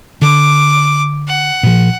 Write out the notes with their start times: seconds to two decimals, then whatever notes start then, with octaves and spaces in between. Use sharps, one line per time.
0.22 D3 D6
1.28 F#5
1.63 A#2 F3